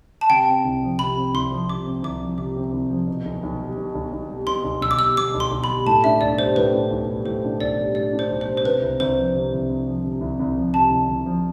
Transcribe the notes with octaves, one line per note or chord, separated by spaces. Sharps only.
A5
C3 G5
C4
C2
F3
C3 B5
C4
C2 C6
F3
C3 D6
C4
C2 D6
F3
C3 D6
C4
C2
F3
B2
B1
B1
G3
B2
B1
B1
G3
B2 C6
B1
B1 E6
D6
G3 E6
B2 D6
B1
C6
B1
B5
G3
A2 A5
D4 E5
B1 D5
G3 C5
A2 B4
D4
B1
G3
A2 C5
D4
B1 D5
G3
A2 D5
D4
C5
B1
C5
G3
C5
C3 B4
C2
C2 C5
F3
C3
C2
C2
F3
C3
C2
C2
F3
C3 A5
C2
C2
F3